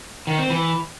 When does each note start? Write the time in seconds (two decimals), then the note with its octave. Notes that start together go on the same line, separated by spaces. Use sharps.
0.27 D#3
0.38 C4
0.50 E3